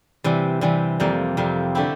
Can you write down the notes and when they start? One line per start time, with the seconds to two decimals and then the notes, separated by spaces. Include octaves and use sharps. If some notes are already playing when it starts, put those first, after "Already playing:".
0.24 C3 E3 G3
0.61 C3 E3 G3
1.00 F2 C3 G3 A#3
1.37 F2 C3 G3 A#3
1.75 D3 A3 C4 E4 G4